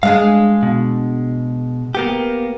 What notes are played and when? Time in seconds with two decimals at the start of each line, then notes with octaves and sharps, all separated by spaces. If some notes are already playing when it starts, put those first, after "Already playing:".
0.03 G#3 D4 G#4 F5
0.63 B2
1.95 A#3 B3 G4